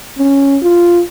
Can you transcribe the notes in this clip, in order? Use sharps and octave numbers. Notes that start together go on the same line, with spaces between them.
C#4
F4